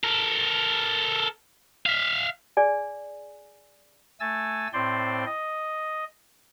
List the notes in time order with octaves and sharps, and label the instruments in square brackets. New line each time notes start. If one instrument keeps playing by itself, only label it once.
[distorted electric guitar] A4 A#4
E5 F5
[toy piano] G#4 D5 G#5
[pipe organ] A3 G#5 E6 A6
A2 C4 C5 D5 C6
D#5